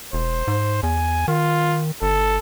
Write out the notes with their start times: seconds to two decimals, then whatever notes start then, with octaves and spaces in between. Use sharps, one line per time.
0.13 E1 C5
0.48 G#2
0.83 E2 G#5
1.28 D#3 F4
2.02 G1 A4